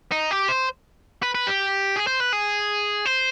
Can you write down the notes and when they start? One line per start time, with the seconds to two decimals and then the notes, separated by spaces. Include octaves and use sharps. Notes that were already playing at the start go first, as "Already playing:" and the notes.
0.12 D#4
0.31 G4
0.48 C5
1.23 B4
1.35 B4
1.47 G4
1.96 G#4
2.07 C5
2.20 B4
2.33 G#4
3.06 C5